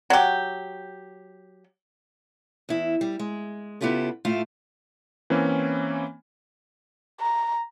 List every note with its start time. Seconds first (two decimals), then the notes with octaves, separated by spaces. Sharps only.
0.10 F#3 G4
2.69 E2 E4
3.01 G3
3.19 G#3
3.81 C#3 B3 E4 F4 G4 A4
4.25 A2 A3 E4 F4 F5
5.30 E3 A#3 C4 C#4 E4
7.20 A#5